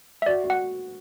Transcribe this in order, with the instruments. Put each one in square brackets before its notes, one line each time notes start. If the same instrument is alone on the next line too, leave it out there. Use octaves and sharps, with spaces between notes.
[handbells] E5
[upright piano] F#4 [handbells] D5
[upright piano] F#4
[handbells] F#5